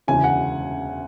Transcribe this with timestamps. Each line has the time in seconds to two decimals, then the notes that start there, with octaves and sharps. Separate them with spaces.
0.07 E1 D2 C#3 E3 G#5
0.24 F#5